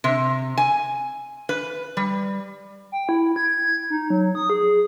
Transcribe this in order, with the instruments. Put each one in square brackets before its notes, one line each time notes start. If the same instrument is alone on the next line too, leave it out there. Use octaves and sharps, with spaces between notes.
[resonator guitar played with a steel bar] C3
G#5
B4
G3
[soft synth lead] G5
E4
G#6
D#4
F#3
D#6
G#4